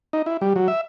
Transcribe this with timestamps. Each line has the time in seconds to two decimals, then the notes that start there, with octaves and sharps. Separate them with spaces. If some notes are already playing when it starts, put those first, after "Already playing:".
0.13 D#4
0.26 E4
0.41 G3
0.56 F#3
0.68 E5